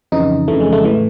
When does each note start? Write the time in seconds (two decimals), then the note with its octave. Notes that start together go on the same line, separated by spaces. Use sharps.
0.12 F2 C#3 E3 D#4
0.48 F2 C#3 E3 A3
0.60 G#3
0.73 A3
0.84 A2 E3 A3